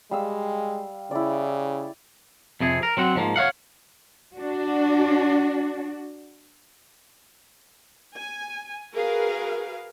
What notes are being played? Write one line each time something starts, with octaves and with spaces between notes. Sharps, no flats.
G3 G#3 F5 E6
C#3 E4 D5
F2 C3 G#4
A#4
F#3 C4 F#5
G#2 F3 A#3
C#5 D5 F5 F#5
D4 F#4
G#5
F#4 G#4 A#4 B4 F5